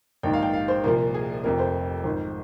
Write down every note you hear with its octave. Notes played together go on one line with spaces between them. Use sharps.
A#1 G#2 D#3 G5
F5
G5
F5
C5
C2 A#2 F3 A#4
G#4
F1 F2 C3 F3 A#4
C5
G#1 G#2 F3